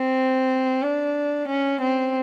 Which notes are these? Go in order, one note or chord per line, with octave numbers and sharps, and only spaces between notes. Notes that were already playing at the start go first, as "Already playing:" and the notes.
Already playing: C4
D4
C#4
C4